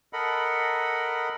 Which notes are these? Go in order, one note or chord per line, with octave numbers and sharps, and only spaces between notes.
A4 A#4 D#5 F#5 B5